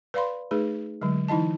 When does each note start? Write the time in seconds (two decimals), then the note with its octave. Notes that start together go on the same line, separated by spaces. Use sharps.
0.14 B4 D5 F5 B5 C6
0.51 A3 D#4 G#4 B4
1.02 D3 F#3 G#3
1.28 E3 D#4 E4 D#5 A5